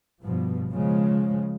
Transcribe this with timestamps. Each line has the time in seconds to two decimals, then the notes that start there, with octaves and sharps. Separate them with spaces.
0.22 G2 B2 F3
0.72 C#3 F3 G#3